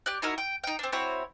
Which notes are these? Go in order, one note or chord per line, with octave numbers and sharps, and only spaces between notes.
G4 D5 F#6
D#4 E4 F#4 A#4
G5
D#4 G5
C4 D4
C4 E4 F#4 C#5